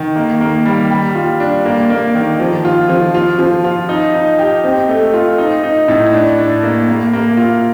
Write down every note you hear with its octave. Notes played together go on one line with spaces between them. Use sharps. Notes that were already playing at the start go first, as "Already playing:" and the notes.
Already playing: D#3
A#3
A#3
G3
G3
F4
D4
A#3
A#3
D#3
F3
F4
F3
F4
F3
F4
D#4
D#4
G4
C4
A3
F4
D#4
D#4
A2
D4
D4
A#3
A#3
A#3
F4